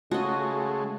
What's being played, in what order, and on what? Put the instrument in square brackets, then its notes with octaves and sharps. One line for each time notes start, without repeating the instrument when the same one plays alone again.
[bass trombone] C#3 [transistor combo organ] G#3 A3 [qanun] F#4 D#5